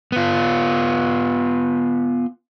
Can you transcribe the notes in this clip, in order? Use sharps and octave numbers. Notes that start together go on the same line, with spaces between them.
B3 F4